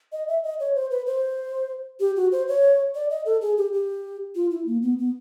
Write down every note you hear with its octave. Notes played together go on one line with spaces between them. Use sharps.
D#5
E5
D#5
C#5
C5
B4
C5
G4
F#4
C5
C#5
D5
D#5
A4
G#4
G4
G4
F4
E4
A#3
B3
B3